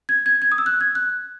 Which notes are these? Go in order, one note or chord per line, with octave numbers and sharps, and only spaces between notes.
G#6
G#6
G#6
D#6
E6
F#6
G#6
F#6